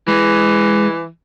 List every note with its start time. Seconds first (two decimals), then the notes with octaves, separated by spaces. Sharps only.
0.08 E3 G#3